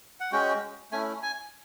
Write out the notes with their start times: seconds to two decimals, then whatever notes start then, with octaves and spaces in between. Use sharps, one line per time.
0.20 F#5
0.32 G#3 C#4 F#4 G5
0.92 A3 C#4 E4 G#5
1.23 G#5